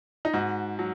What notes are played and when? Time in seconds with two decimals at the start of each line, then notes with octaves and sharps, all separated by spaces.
0.25 D#4
0.34 G#2 F#4
0.79 F#3